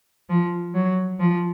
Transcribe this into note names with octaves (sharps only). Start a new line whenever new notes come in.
F3
F#3
F3